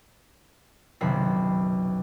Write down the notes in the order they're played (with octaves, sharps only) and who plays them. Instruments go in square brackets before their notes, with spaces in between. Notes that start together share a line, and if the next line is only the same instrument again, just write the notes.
[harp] F#1 B1 C3 D#3 B5 C7